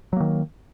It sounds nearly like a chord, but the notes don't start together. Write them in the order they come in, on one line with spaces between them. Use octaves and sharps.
F#3 A#3 D#3